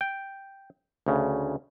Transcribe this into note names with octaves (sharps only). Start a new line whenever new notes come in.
G5
D2 C#3